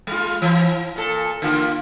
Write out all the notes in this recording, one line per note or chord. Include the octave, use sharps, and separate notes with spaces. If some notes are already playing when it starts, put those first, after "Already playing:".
G#3 F4
E3
A#2 A4
D3 A#3 F4